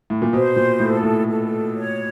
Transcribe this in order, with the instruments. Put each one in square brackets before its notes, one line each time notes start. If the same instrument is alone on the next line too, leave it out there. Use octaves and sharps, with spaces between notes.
[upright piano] A2
A#2
[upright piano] B2 [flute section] C5
[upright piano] A#2
[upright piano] A2 [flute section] A4
[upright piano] A2
[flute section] A4
C#5